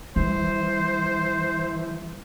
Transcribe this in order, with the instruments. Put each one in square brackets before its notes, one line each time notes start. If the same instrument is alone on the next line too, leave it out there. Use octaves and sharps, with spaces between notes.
[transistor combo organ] E3 [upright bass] G3 [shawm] C5